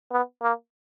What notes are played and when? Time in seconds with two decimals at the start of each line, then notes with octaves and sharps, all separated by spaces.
0.11 B3
0.42 A#3